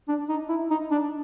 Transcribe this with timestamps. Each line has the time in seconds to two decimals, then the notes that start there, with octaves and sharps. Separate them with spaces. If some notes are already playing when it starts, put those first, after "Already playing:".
0.08 D4
0.29 D#4
0.49 E4
0.70 D#4
0.91 D4